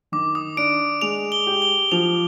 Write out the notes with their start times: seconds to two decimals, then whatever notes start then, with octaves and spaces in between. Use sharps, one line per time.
0.12 D#3 D6
0.35 D#6
0.57 D4 D7
1.01 G#3 F7
1.32 G7
1.47 G4
1.62 G7
1.92 F3 F7